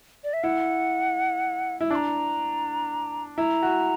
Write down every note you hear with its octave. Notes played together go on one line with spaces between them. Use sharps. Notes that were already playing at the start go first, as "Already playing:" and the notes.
D5
E5
E4 F#5
E4
D4 D6
A#5
E4 A#5
F#4